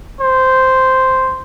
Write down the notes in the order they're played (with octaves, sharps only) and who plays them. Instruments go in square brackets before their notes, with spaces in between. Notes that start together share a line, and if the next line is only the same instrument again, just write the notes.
[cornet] C5